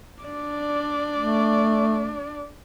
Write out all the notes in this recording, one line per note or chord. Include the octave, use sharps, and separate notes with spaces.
D4 D5
A3